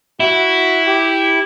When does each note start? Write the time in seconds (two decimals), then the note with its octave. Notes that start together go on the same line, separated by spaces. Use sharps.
0.20 E4 F#4
0.87 G4